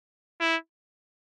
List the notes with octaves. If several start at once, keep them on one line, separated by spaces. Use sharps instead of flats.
E4